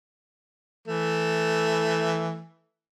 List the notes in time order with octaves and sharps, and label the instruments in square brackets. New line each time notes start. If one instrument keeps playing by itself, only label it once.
[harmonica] E3 A3